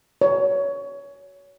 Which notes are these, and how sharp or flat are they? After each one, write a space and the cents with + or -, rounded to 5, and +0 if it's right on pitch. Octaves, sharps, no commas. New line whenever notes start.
C#5 +20